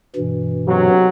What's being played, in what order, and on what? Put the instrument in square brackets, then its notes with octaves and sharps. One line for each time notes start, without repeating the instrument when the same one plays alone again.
[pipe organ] G2 B2 E3
[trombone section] B1 C3 F#3